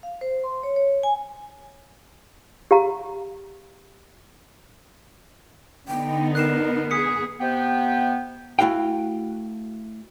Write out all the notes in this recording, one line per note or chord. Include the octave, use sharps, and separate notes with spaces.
F5
C5
C6
C#5
C#5
G#5
G4 F5 A#5
D3 B3 D#4 G5
A#4 F#6 C7 E7
B3 G#4 D#6 B6 C#7
C3 B3 G5
A3 E4 F#4 F5 G5